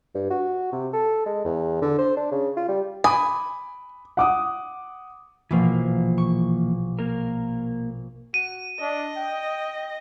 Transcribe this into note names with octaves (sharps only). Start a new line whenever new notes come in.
G2
F#4
C3
A4
G#3
E2
D3
C5
D4
C#3
F4
G3
G#5 B5 D6 D#6
F#5 D6 D#6
A#1 B2 E3 F3 A#3
C#6
A#3 A#4
F#4 D#7
D4 D#5
G5